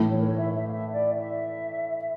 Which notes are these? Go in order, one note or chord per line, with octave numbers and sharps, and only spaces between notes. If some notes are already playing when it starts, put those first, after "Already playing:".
Already playing: A2 E3 A3
C#5
A#4
C#5
E5
E5
F5
E5
D5
E5